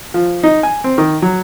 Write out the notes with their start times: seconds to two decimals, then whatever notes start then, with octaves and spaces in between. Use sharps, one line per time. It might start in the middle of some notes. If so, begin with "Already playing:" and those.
0.14 F3
0.43 D#4
0.63 G#5
0.84 C4
0.98 D#3
1.22 F#3